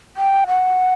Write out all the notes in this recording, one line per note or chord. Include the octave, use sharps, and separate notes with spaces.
G5
F#5